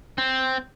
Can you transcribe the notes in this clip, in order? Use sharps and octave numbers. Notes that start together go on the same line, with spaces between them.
C4